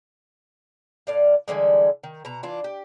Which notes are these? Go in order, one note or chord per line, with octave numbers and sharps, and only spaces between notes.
A2 D5 F5
D3 E3 G3 G#3
D#3
B2 A#5
E3 D4 F4
G4